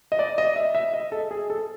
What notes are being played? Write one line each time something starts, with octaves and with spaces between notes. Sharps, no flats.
D#5
D5
D#5
E5
E5
D#5
A4
G#4
A4